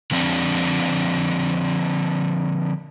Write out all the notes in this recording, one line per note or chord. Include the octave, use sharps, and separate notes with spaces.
D3 F3 C4 D4